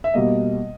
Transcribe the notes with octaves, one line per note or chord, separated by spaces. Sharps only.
E5
B2 G3 A#3 D#5